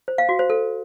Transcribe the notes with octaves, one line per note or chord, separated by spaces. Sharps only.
C5
F5
F#4
C5
A4